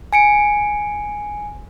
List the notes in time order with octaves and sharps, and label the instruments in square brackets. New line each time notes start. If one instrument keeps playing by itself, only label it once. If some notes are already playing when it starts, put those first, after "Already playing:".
[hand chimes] G#5 C#7 D7